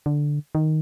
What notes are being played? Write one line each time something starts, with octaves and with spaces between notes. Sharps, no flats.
D3
D#3